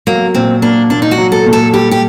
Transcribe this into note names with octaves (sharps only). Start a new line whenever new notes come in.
F#3 A#3
A#2 C4
A#3 D4
A#2 D4
D#4
F#4
F#3
A4
A#2
A4
G3 G4
G4